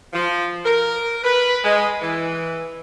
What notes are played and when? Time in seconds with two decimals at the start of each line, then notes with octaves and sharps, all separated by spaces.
0.13 F3
0.65 A#4
1.24 B4
1.64 G#3
2.01 E3